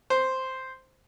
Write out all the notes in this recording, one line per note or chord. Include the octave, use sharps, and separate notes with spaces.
C5